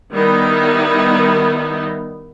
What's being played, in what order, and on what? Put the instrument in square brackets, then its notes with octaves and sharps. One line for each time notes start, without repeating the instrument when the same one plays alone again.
[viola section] D#3 G3 B3 D#4 E4